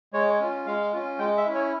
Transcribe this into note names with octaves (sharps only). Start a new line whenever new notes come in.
G#3 C#5
C#4 F4
G#3 F5
C#4 F4
G#3 G5
E5
C#4 E4
C#5